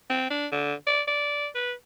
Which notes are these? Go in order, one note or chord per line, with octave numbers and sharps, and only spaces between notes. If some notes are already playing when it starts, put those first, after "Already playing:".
C4
D4
D3
D5
D5
B4